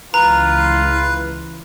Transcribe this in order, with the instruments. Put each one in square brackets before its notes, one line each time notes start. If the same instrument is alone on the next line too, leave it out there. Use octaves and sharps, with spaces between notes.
[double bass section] C#2 E3 [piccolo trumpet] F4 [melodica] B4 [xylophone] A#5